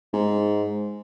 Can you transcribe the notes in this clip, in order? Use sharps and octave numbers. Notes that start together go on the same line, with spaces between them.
G#2